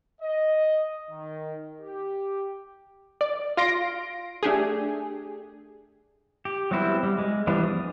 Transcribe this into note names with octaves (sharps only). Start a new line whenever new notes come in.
D#5
D#3
G4
D5
F4 C6 A#6 D7
A3 D4 G4 G#4
G4
F#3 G3 B3 C4 E4
G3
G#3
E3 F3 G3 B3 D4
D#6